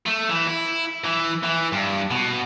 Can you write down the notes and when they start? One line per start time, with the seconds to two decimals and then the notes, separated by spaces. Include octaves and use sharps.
0.06 A3
0.30 E3
0.47 E4
1.04 E3
1.43 E3
1.72 G2
2.11 B2